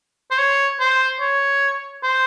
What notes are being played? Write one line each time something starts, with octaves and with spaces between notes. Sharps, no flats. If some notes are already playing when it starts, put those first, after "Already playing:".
C5
C#5
C5
C#5
C5